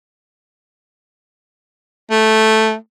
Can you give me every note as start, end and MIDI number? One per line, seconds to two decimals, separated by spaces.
2.11 2.75 57